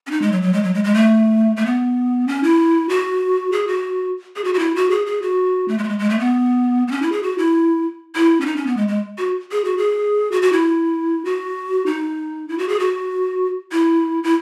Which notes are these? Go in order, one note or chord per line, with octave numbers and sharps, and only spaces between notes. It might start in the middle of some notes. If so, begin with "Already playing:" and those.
C#4
D#4
G#3
F#3
F#3
G#3
F#3
G#3
G#3
A3
A3
B3
C#4
E4
F#4
G#4
F#4
G#4
F#4
F#4
E4
F#4
G#4
G#4
F#4
A3
G#3
A3
G#3
G#3
A3
B3
B3
C#4
E4
G#4
F#4
E4
E4
C#4
D#4
C#4
B3
G#3
G#3
F#4
G#4
F#4
G#4
F#4
F#4
E4
F#4
D#4
E4
F#4
G#4
F#4
E4
E4